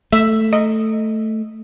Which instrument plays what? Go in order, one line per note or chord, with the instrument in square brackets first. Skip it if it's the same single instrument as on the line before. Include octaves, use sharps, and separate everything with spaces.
[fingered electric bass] A3 [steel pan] E5
[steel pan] D#5